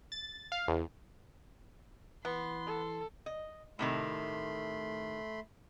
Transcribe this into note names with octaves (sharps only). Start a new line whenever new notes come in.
A6
F5
E2
E3 B3 C6
A4
D#5
A2 C3 D#3 A3 B5 C6